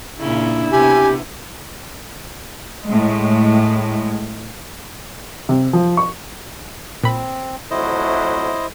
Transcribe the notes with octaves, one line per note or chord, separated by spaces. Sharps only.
A#2 C#3 D4 E4
C3 B3 G4 G#5
A2 G#3
C3
F3
C#6
A#2 C4 B5
F2 F#3 A3 E4 C5 D#5